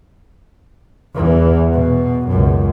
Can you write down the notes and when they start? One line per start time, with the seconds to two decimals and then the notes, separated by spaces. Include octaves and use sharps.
1.14 E2 E3
1.72 B2
2.28 C#2 F#2